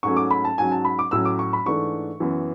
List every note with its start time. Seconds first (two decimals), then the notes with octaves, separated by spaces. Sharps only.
0.03 G#2 F#3 A3 C#4 C#6
0.17 D6
0.31 B5
0.45 A5
0.58 G#2 F#3 C#4 G#5
0.72 A5
0.85 B5
0.99 D6
1.11 A2 F#3 C#4 E6
1.25 D6
1.39 C#6
1.53 B5
1.66 G#2 E3 A3 D4 C#6
2.20 F#2 E3 B3